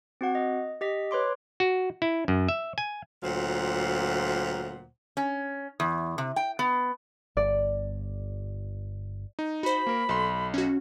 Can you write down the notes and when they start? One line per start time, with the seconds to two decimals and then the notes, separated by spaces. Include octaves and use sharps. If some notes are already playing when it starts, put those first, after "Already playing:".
0.21 C4 F#4 F#5
0.35 D#5
0.81 G4 D#5 B6
1.11 B4 C#5 C6 D6
1.60 F#4
2.02 E4
2.28 F#2
2.49 E5
2.78 G#5
3.23 D2 A#2 F#3 F4 C5 F#5
5.17 C#4
5.80 E2
6.18 C3
6.36 G5
6.59 B3
7.37 G1 D5
9.39 D#4
9.63 F#4 C5 B5
9.87 A#3 A#4
10.09 B1 A4 C6
10.54 C#4 F#4